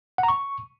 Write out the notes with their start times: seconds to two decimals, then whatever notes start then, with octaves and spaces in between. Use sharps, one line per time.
0.18 F#5
0.23 A#5
0.28 C#6